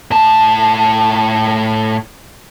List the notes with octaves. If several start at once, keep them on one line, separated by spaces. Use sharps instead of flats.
A2 A5